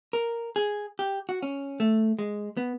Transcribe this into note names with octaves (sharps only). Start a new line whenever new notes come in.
A#4
G#4
G4
F#4
C#4
A3
G#3
B3